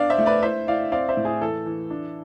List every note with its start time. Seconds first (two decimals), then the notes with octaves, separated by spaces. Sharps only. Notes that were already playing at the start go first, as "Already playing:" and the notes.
Already playing: B3 D4 D5 F5
0.10 C5 E5
0.18 A3
0.26 B4 D5
0.43 E4 C5 E5
0.67 E4 D5 F5
0.92 C4 D5 F5
1.09 C5 E5
1.17 A2
1.25 G#4
1.41 E3 A4
1.66 E3
1.91 D4